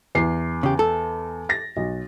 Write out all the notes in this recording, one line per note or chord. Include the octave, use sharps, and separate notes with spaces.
E2 C7
C#3 G4
A4
A6 A#6
B1